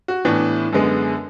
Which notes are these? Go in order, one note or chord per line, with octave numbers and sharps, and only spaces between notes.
F#4
A2 E3 B3 D4
F#2 D3 G#3 B3